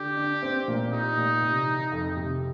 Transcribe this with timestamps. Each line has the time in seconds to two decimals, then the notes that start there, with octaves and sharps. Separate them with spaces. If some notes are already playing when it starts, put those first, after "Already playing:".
Already playing: D3 G4
0.17 D4
0.42 C4
0.68 A#2
0.92 D#4 G4
1.17 A#2
1.42 C3
1.66 D#3
1.92 F2
2.16 C3